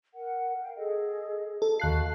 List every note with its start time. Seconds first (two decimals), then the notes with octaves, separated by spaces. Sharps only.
0.15 A#4 F#5
0.61 F5 G5
0.77 G#4 A4 D#5
1.62 A4
1.80 D#2 F#4 F5 A5 F#6 C7